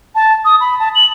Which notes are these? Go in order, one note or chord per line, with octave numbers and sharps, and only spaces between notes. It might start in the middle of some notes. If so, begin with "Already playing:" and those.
A5
D#6
B5
A5
F#7